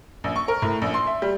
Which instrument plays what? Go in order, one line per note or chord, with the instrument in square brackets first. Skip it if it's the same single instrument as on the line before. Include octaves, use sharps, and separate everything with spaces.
[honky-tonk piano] A#1
C#6
A#4
A2
A#1
C6
E5
G3